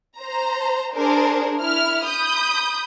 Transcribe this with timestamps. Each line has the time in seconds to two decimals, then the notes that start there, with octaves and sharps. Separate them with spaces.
0.18 C5 A#5
0.94 D4 G#4 A#4 C5
1.59 E4 F6
2.05 B5 D#6 G6